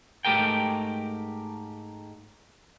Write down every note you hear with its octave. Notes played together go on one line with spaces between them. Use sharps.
G#2 A3 G4 A#4 G5